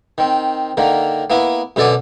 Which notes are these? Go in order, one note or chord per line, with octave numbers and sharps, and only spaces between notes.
D#3 C4
D3 D#3 A#3
A#3 B3 E4
F#2 B2 D3 A4 D5 G#5